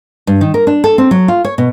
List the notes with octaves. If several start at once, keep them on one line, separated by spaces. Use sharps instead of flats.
G2
D#3
A#4
D4
A4
C4
F#3
F4
C#5
B2